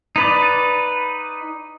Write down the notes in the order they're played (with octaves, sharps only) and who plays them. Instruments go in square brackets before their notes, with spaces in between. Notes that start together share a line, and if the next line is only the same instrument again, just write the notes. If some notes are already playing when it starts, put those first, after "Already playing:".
[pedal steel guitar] D#4 B4 D5